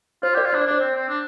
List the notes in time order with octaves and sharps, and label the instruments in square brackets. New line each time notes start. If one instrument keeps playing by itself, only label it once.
[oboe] F4 [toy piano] C5
[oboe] G4
[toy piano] A#4 D5
[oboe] F4
[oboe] D4 [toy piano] C5
[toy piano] D5
[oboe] D4 [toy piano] C5
[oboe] C4
C4
D4